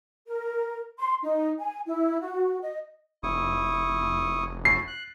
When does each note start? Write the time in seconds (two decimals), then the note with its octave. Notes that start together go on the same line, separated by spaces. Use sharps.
0.28 A#4
0.99 C6
1.23 D#4
1.59 G#5
1.86 E4
2.21 F#4
2.62 D#5
3.23 F1 E4 C#6 D#6
4.65 E4 F#4 C7
4.87 F#6